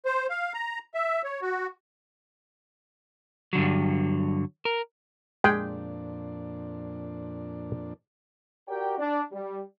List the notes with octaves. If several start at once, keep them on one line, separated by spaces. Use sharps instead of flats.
C5
F5
A#5
E5
C#5
F#4
G2 D3 F#3
A#4
F2 A#2 G#3 D4 G#4 G5
F#4 G4 A#4 D5 G5
D4
G3